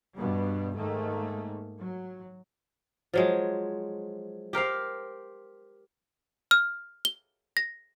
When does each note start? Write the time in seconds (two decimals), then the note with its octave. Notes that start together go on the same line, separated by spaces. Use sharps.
0.17 G2 B2 G3 B3
0.75 G#2 D#3 A3 A#3
1.77 F#3
3.13 F3 F#3 G#3
4.53 G4 A#4 C5 F5
6.51 F6
7.05 G7
7.57 A#6